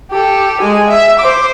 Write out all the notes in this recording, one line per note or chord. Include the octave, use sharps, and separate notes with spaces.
G4 A4
G#3 G#5
E5
C5 D6